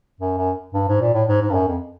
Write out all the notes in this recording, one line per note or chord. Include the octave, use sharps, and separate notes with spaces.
F#2
F#2
G2
G#2
A#2
A2
G#2
G#2
G2
F#2
F2